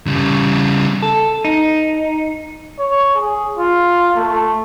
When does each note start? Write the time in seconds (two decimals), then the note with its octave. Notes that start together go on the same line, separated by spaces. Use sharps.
0.07 C#3 G3
1.02 A4
1.45 D#4
2.79 C#5
3.15 G#4
3.57 F4
4.16 A3